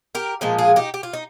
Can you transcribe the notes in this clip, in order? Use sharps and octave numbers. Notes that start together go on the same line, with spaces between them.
G4 A#4
A#2 F3 G#3 C5
F4 G#4
D#4 G4
G4
F4
D#4